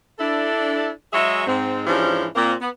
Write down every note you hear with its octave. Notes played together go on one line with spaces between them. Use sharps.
D4 E4 A4
F#3 G#3 G#4 C#5 E5
G#2 C4
G#2 E3 F3 C#4 D4 G4
A#2 A#3 C4
B3